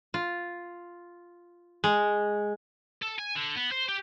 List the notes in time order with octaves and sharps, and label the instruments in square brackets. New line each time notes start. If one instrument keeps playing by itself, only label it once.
[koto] F4
G#3
[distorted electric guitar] A4
G#5
D3
B3
C5
G4